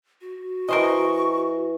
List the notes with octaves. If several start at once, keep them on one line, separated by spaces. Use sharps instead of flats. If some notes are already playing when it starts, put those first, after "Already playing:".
F#4
E3 A#4 C5 D#5 C#6